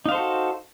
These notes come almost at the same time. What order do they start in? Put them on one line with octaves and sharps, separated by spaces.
D#4 F5 C5 A4 F#4